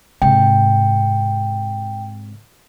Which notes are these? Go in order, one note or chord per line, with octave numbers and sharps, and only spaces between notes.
G#2 C3 G5